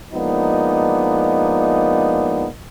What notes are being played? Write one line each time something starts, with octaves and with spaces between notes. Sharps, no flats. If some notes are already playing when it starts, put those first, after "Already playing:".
F3 G#3 A#3 B3 D4 D#4